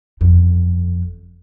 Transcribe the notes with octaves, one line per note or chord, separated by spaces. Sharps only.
G1 F2